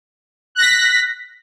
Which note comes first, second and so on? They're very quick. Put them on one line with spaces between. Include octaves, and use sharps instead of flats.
F#6 A#6 B6